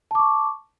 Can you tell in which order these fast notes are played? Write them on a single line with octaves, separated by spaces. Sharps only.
A5 D6 C#6